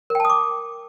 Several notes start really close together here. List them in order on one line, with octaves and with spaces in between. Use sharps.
A#4 G5 A5 D#6 D6